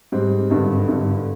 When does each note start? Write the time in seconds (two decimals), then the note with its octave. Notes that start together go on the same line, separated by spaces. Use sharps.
0.12 G#2 G3 C4
0.50 G#1 G2 D3
0.87 G#1 G2 D3